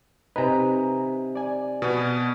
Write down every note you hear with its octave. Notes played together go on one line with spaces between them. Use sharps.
C3 D#4 B4 G#5 A#5
D5 G#5
B2 B3